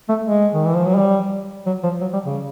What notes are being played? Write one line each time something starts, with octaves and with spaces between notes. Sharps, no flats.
A3
G#3
D#3
E3
F3
F#3
G3
F#3
F3
F#3
G3
C#3